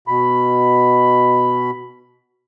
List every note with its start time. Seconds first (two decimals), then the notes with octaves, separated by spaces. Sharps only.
0.08 B2 B5